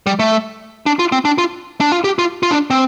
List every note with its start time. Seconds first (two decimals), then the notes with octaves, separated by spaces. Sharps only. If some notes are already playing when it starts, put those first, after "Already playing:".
0.07 G3
0.19 A3
0.86 D4
0.99 F4
1.12 C4
1.25 D4
1.38 F4
1.80 D4
1.92 F4
2.04 G4
2.19 F4
2.43 F4
2.51 D4
2.70 C4